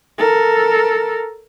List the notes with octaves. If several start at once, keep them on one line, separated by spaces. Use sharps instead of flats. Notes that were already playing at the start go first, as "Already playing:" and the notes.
A4 A#4